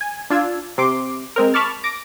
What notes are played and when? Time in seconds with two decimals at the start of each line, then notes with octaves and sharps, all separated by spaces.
0.01 G#5
0.30 D4 F4 E6 G#6
0.78 C3 C6 D6
1.36 G#3 C4 A#4
1.54 A5 B5 C#6 D6 F6 A6
1.84 D6 A#6 D7